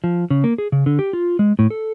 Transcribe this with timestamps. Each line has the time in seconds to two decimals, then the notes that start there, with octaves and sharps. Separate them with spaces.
0.04 F3
0.30 C#3
0.44 A#3
0.58 G#4
0.72 C#3
0.86 D3
0.99 G4
1.13 F4
1.39 G#3
1.59 A2
1.70 A4